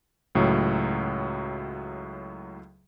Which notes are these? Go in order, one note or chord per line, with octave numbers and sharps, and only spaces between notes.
C#2 A2 F#3